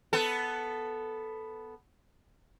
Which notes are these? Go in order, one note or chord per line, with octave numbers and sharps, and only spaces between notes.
B3 A4